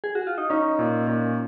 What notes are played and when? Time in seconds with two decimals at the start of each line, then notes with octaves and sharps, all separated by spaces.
0.04 G#4
0.15 F#4
0.27 F4
0.38 D#4
0.50 C#4 D#4
0.79 A#2
1.07 A#2